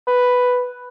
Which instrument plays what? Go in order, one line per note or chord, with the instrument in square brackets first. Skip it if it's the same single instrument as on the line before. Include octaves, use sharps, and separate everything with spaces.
[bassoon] B4